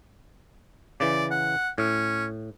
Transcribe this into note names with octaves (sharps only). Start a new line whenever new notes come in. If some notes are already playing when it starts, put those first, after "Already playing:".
C#3 E3 D5
F#5
A2 C#4